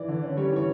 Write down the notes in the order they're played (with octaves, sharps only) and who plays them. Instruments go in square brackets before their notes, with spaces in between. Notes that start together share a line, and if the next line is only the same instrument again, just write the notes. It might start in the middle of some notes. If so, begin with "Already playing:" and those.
Already playing: [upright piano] E3 D5
D3
C#4
G3 C#5
E3 C#5